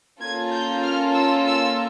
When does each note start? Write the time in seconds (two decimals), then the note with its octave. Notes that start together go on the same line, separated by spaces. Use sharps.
0.20 A#3 C#4 F4 A4 G#6
0.52 G6
0.83 F6
1.14 E6
1.46 E6